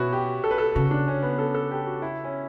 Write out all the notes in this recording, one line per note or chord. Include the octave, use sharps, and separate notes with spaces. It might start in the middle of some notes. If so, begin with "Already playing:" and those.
Already playing: B2 B3 C#4 E4 F#4
G4
A4
B4
A4
C#3 F#4
D4
C#4
B3
A4
A4
G4
F#4
E4
C#4